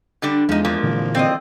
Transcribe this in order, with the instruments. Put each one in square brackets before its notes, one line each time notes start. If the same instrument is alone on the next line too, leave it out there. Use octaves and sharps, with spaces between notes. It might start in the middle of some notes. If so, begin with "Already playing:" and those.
[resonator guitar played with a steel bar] D3 G3 D4
[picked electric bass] E2 [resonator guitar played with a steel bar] F3 D#4 [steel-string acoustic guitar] G#3 D4 F4
[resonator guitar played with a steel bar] F2 F3 A#3
[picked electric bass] A#2 D3 E3
[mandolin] C4 D#5 [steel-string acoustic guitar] D5 F5